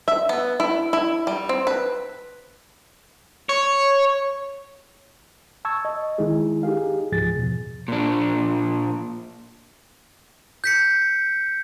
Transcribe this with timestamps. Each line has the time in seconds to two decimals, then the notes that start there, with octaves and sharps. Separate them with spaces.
0.08 E5
0.29 B3
0.60 E4
0.93 E4
1.27 G3
1.49 C4
1.67 B4
3.49 C#5
5.65 A5 C#6 E6 G#6
5.85 D#5
6.18 D#3 G#3 D#4 E4 G#4
6.63 D#4 G4 G#4 F5
7.12 C#2 G#2 F3 G#4 A6
7.36 E2 B2
7.88 A#2 D4
10.64 G6 B6 C#7